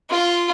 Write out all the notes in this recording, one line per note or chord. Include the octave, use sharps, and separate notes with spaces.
F4